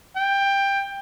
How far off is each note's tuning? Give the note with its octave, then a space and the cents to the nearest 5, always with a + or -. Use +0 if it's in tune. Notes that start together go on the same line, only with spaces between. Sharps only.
G5 +15